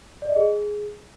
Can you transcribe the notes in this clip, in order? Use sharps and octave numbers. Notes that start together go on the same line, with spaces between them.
D5
D#5
G#4